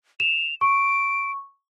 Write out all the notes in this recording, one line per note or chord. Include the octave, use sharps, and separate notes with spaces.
E7 F7
C#6 D7